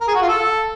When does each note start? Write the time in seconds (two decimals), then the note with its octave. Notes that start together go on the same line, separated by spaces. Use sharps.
0.01 A#4
0.08 G#4
0.14 F#4
0.21 F4
0.28 A4